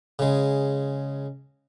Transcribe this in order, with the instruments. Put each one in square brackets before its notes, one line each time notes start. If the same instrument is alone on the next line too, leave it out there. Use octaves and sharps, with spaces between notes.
[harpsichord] C#3 G#3